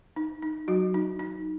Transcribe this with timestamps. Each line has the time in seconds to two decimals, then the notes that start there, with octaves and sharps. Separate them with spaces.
0.16 D#4
0.42 D#4
0.68 F#3 F#4
0.94 D#4
1.19 D#4